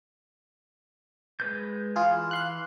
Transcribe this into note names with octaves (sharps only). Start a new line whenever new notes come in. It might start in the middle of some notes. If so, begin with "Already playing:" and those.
G#3 B4 G6
E3 F4 G#4 F6
F5 C6 F#6